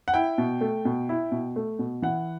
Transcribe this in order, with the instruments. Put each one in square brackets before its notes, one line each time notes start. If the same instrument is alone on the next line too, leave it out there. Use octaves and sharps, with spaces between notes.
[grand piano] F#5
E4 G5
B2
A3
B2
E4
B2
A3
B2
E3 F#5